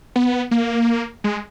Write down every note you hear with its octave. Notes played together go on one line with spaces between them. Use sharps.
B3
A#3
G#3